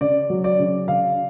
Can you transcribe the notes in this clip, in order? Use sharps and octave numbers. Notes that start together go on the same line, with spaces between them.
C#3 D5
F#3
D5
C#3
C#3 F5